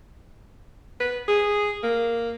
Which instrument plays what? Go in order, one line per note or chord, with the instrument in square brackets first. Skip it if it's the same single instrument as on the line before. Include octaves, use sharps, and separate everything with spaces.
[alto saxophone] B4
G#4
A#3